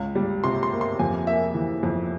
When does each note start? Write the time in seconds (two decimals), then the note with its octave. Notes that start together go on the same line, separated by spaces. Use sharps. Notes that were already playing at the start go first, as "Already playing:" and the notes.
Already playing: C#2
0.15 G3
0.44 C3 C6
0.63 C6
0.72 A#3
0.81 C6
0.99 F2 G#5
1.27 A#3 E5
1.54 E3
1.83 F2